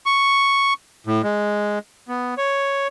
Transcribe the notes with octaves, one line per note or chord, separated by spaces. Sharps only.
C#6
A2
G#3
B3
C#5